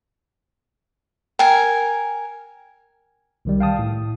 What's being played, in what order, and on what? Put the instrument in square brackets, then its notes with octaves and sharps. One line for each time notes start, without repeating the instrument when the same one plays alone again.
[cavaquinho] A#4 G#5 [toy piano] G5
[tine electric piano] C2 D#3 G3
F5 G5 A5 D#6
A2